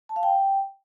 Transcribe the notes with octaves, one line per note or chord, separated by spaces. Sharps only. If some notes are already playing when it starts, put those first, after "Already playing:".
A5
F5
G5